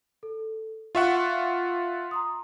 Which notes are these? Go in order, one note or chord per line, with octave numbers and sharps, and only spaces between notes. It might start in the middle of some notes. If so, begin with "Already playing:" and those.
A4
F4 E5 F#5 C#6
A#5 C6 D#6